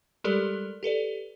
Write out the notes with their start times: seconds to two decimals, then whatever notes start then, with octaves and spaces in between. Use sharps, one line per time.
0.24 G3 G#3 G4 A4 A#4 D5
0.83 G4 A4 B4 D5